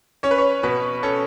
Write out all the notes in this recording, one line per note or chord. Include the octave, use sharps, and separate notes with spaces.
C#4 C#5
B4
C#5
B2 B4
C#4 A4